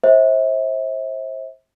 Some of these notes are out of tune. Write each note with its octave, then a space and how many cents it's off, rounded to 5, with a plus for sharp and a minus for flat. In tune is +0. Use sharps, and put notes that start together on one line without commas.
C5 +30 E5 -35